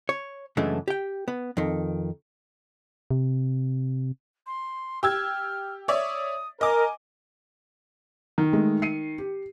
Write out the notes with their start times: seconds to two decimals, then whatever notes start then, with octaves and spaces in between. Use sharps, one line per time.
0.09 C#5
0.57 F#2 C#3 E3 G#3 A3 D4
0.88 G4 G5
1.28 B3
1.57 F2 D#3
3.11 C3
4.47 C6
5.03 G4 E6 F6 G#6
5.88 C#5 D5 E5 D#6
6.61 A#4 D#5 G#5 D6
8.38 D#3
8.53 G#3 A3
8.82 C7 C#7 D#7
9.18 G4